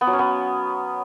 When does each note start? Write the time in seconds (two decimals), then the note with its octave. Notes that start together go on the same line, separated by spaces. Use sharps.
0.01 B3
0.07 F#3
0.13 C#4
0.19 B3